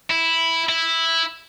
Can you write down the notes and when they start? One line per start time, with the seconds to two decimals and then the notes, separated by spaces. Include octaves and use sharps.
0.11 E4
0.69 E4